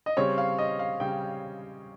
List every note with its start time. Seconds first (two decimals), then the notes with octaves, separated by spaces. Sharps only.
0.06 D#5
0.17 C#3 G3 C4 C#5
0.38 F5
0.58 D#5
0.79 F5
1.00 C#3 G3 G5